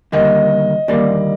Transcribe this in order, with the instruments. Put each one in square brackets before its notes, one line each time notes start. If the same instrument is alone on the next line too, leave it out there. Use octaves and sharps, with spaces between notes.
[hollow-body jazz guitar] D#2 D3 G3 A#3 [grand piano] D#5
[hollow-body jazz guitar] D#2 D3 G3 A#3 [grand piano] D5